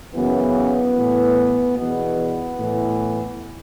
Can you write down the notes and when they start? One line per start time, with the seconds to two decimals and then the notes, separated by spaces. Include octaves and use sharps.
0.14 F#2 C#3 E3 B3
0.95 A2 E3
1.77 E2 B2 B3
2.58 A2 E3